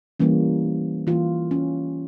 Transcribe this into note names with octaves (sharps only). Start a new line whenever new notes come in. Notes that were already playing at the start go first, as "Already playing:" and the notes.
E3 G3 A#3 C#4
E3 A#3 F4
C#4